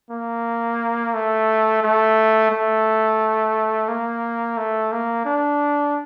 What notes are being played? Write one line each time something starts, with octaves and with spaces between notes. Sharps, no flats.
A#3
A3
A3
A3
A#3
A3
A#3
D4